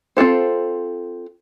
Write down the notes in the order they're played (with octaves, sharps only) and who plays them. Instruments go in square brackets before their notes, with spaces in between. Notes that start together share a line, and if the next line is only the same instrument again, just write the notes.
[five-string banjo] C4 F4 A4 C5